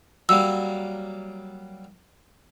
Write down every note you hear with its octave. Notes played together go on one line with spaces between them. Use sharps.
F#3 G3 A#3 E6